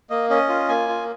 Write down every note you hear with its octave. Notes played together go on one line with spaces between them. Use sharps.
A#3 D#5
C#4 D#5
F4
A#3 G#5
F4